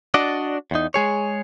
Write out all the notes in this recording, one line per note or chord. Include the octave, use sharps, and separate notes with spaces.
D4 F#4 D5 D#5
E2 D#4
G#3 G#4 C#5